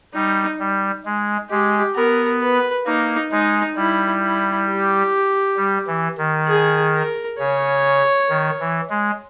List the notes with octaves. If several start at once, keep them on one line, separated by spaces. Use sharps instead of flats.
G3 D#4
G3
G#3
G#3 G4
B3 A#4
B4
A#3 D#4
G#3 D#4
G3 E4
E4
G4
G3
E3
D#3
G#4
A#4
C#3 C#5
D#3
E3
G#3